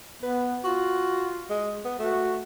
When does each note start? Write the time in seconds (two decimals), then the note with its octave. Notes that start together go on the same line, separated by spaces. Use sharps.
0.23 B3 B4
0.64 F4 F#4
1.50 G#3
1.85 B3
1.99 A3 F#4